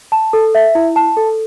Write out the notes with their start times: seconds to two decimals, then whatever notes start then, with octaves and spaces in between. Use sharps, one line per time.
0.12 A5
0.33 A4
0.55 E5
0.75 E4
0.96 A5
1.17 A4